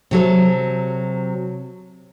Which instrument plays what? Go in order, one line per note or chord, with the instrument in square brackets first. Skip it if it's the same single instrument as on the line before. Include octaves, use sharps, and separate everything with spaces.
[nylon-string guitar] C3 F#3 A4